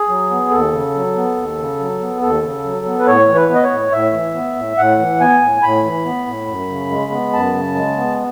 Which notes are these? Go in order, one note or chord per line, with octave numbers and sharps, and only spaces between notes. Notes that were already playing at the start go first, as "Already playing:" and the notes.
Already playing: G#4
F#3
B3
D#2 A4
C#3
F#3
B3
D#2
C#3
F#3
B3
D#2 A4
C#3
F#3
B3
B4
A2 C#5
E3
B4
B3
D#5
C#5
A2
A2 E5
E3
B3
A2
A2 F#5
E3
B3 G#5
A2
A2 B5
E3
B3
A2
F#2
C#3
G#3
B3
F#2 A5
C#3
G#3
B3